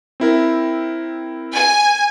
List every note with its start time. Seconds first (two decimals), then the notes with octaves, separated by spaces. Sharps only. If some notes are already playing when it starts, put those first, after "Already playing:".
0.20 C4 E4 A#4
1.53 G#5